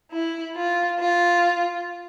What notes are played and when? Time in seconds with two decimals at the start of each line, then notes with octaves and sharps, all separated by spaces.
0.10 E4
0.54 F4
0.98 F4